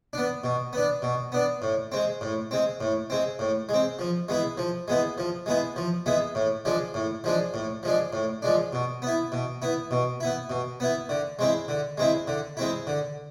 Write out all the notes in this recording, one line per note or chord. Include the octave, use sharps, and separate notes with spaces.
B3 D4
B2
B3 D4
B2
B3 D4
A2
G#3 C4
A2
G#3 C4
A2
G#3 C4
A2
G#3 C4
F3
G#3 B3 E4
F3
G#3 B3 E4
F3
G#3 B3 E4
F3
G#3 B3 E4
A2
F3 G#3 D4
A2
F3 G#3 D4
A2
F3 G#3 D4
A2
F3 G#3 D4
B2
B3 E4
B2
B3 E4
B2
B3 E4
B2
B3 E4
D3
G#3 C4 E4
D3
G#3 C4 E4
D3
G#3 C4 E4
D3